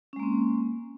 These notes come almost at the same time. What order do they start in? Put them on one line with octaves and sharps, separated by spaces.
C#4 G#3 A#3 C4